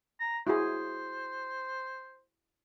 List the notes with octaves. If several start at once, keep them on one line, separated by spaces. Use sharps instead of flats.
A#5
E4 F#4 G#4 C5